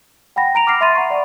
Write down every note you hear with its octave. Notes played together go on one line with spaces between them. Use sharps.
F#5 G5 B5 A#6
A#5 D7 F7
D6 F6 A#6 C7
E5 B5 C6 A6 D#7
F#5 A#5 C#6
D5 F#5